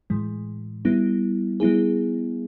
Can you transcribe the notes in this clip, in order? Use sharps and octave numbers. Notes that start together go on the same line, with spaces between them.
A2 E3 G#3
G3 B3 E4
G3 B3 E4 G#4